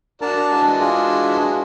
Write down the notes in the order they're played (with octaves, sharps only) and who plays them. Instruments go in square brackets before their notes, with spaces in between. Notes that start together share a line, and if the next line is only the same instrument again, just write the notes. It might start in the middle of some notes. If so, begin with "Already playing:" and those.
[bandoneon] D4 A5 [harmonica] F#4 A#4 D5
[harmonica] E3 G#3 F#4
[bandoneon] D4 F4 G#4